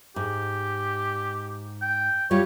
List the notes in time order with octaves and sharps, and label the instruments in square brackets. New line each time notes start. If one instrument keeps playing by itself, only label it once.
[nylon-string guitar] G#2 [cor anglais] G4
[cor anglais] G5
[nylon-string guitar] G3 F4 G4 [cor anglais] C#5